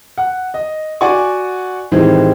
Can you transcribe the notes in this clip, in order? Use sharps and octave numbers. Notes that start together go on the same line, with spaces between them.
F#5
D#5
F#4 D5 F#5 G#5 C#6
A2 D#3 E3 G3 G#3 C4